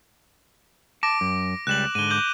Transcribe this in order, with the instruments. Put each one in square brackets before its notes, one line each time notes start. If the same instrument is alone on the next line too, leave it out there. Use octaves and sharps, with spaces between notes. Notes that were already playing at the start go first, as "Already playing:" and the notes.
[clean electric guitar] A5 [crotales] D6 A#6 D7
[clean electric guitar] F#2
[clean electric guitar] C#2 G3 [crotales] F#6 E7 F#7
[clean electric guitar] G#2 D3 [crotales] D#7 G7
[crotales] D6 G6 F#7